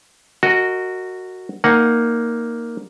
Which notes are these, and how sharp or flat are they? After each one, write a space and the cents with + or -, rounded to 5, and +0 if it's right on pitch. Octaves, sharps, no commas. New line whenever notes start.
F#4 +0 A#4 -25 D#5 +0
A#3 +0 D#4 +0 F#5 +0